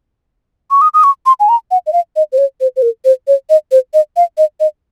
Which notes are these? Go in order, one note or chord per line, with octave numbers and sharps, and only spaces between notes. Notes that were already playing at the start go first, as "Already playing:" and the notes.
C#6
D#6
D#6
C#6
C6
G#5
A#5
F#5
D#5
F5
D#5
C5
C#5
C5
C5
A#4
C5
C#5
D#5
C5
D#5
F5
D#5
D#5